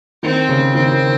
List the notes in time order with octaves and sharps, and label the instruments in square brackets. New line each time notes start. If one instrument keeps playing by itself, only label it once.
[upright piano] D#3 [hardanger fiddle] C4
[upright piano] C#3
[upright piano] D#3 [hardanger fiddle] C4
[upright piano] D#3